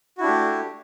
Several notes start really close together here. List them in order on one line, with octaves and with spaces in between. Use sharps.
F#4 E4 D4 G4 A3